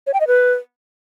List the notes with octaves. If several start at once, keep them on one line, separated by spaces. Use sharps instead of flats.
C#5
G5
D#5
B4